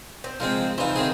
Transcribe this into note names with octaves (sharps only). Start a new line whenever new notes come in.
C4
F3 G#3 C4 A#4
E3 D#4 C5 F5
D#3 C4 G#4